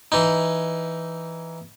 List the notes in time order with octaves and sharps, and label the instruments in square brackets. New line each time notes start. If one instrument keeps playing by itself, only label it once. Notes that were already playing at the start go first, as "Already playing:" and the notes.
[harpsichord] E3 D#4